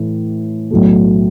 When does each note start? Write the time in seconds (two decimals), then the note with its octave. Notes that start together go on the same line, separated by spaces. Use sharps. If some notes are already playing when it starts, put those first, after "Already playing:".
Already playing: A2 E3 A3
0.71 B1 A2 F#3 A3